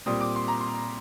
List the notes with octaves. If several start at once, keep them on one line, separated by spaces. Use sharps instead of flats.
A#2 G3 C4 D#6
D6
C6
A#5
C6